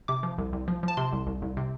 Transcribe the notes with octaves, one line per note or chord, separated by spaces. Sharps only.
C3 D6
F3
C2
C2
F3
F3
A5
C3 C6
C2
C2
C2
C3